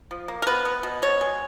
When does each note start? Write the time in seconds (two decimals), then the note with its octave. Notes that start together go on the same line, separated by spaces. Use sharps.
0.11 F3
0.28 A#3
0.42 A#4
0.47 B3 B4
0.65 B3
0.83 B2
1.02 B2 C#5
1.21 G#3